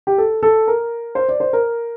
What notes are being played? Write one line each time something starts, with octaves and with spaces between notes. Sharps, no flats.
G4
A4
A4
A#4
C5
D5
C5
A#4